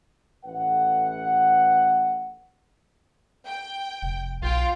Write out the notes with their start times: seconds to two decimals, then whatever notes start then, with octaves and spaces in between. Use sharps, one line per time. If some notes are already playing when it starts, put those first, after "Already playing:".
0.45 A1 A3 B4 F#5
3.45 G5
4.02 F1
4.42 B1 F4 G5